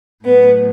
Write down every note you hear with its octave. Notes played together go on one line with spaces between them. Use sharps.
A2 F#3 B3